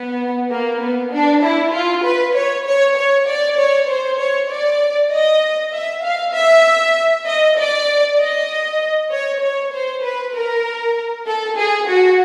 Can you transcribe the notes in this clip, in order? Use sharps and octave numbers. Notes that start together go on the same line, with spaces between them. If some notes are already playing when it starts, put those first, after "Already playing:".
Already playing: B3
A#3
B3
D4
E4
F4
B4
C#5
C#5
C#5
D5
C#5
C5
C#5
D5
D#5
E5
F5
E5
D#5
D5
D#5
C#5
C#5
C5
B4
A#4
A4
G#4
F#4